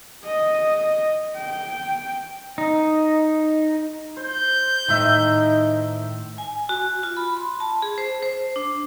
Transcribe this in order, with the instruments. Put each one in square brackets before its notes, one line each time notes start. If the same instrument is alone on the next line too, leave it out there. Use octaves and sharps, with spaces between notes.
[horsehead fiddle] D#5
G5
[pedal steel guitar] D#4
[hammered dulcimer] C5 [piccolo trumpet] G6
[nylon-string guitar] A2 D#3 [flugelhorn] D#4 [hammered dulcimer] E5 C6
[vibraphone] G#5
F#4
F4
B5
C6
A5
G#4
C5
C5
D4